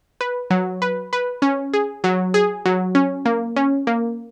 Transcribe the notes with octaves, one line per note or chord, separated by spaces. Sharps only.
B4
F#3
B4
B4
C#4
G#4
F#3
G#4
F#3
C#4
A#3
C#4
A#3